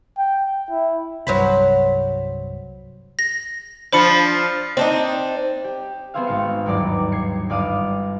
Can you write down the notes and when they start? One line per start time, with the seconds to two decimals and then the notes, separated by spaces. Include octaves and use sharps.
0.18 G5
0.70 E4
1.27 C2 G2 F#3 C5 B5
3.19 A#6
3.93 F3 D4 C5 B5 C#7
4.77 C4 D4 D#4
5.64 G4
6.14 B3 C4 G#4 C5 E5 F5
6.27 G#1 F5 C#7
6.65 G1 D#2 G#2 F#3 D5
7.12 G#6 C7 C#7
7.50 G1 D5 F5 D#6 D#7